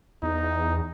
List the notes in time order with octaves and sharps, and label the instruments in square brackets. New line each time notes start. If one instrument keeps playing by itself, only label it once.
[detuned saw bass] E2 [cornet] D#4